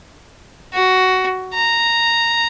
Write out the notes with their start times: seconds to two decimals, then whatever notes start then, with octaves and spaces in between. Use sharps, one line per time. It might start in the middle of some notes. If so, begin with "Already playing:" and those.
0.74 F#4
1.54 A#5